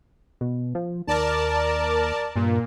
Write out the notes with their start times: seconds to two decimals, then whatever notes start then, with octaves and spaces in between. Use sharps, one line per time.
0.41 B2
0.75 F3
1.07 D#2 A#4 D5 A5
2.36 G2 A#2